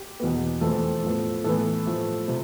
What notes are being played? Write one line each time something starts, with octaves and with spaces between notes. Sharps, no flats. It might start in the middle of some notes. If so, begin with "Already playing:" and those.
Already playing: G4
E2 B2 B3
F2 E3 A3 C4 A4
A2 F3 B3
A2 E3 B3 A4
A2 F3 A3
C3 F3